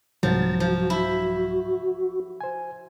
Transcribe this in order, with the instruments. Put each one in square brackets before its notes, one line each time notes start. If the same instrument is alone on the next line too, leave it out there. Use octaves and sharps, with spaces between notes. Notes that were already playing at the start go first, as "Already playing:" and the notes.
[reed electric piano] C2 G#2 F#3 [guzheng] F3 [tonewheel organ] A6
[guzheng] F3 [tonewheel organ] F#4
[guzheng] E4
[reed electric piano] C5 G#5